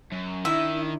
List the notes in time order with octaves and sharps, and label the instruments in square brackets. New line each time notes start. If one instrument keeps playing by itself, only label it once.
[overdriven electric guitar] F#2
[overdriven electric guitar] D#3 [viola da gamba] D4 E4 [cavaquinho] E5